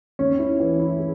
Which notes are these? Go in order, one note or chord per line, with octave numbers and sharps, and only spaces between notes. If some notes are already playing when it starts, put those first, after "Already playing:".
D#2 C#4
E4
E3
E4
G#4